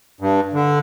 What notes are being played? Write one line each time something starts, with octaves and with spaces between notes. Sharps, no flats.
G2
D3